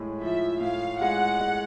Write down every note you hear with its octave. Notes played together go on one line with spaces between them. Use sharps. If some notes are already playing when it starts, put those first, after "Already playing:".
Already playing: A2 G#3
F3 E5
A2 F5
G#3 F#5
G#3